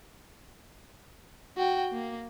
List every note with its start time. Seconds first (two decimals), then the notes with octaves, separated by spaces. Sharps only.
1.57 F#4 G5
1.93 A#3